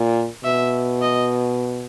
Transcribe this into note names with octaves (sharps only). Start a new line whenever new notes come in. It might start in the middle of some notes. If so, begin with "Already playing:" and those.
Already playing: A#2
B2 E5
D#5